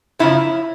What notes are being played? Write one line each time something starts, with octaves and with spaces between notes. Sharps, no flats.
F#2 C#3 F3 E4